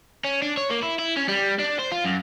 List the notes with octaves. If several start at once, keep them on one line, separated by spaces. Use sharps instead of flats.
C#4
D4
C#5
A#3
E4
E4
C#4
G3
D4
C5
F4
F#2